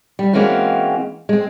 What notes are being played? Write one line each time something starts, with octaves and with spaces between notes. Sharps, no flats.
G3
E3 G#3 A#3 C4 C#4 F#4
G#3 C4